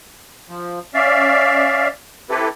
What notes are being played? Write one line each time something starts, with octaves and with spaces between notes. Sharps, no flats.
F3
C#4 D5 E5 F5
C4 E4 G4 A4 B4